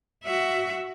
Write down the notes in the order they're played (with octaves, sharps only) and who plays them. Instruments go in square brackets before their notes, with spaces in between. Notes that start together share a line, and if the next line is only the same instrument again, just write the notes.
[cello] F#4 E5